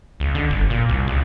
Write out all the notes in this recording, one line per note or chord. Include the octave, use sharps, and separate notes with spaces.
C#2
D3
G1
A#2
C2
C#2